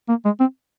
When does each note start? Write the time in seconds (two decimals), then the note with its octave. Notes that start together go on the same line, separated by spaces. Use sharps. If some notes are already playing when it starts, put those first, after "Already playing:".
0.09 A#3
0.25 G#3
0.40 C4